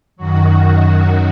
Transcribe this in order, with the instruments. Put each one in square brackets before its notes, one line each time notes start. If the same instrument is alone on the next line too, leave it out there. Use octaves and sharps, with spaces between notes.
[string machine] F#2 D#3 F#3 F#4